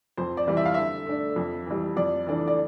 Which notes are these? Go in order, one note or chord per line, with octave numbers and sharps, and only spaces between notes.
F2 C5
D5
E3 G3
E5
F5
D3 E5
A3 D4
F2
E3 G3
F2 D5
E3 A3 D4
D5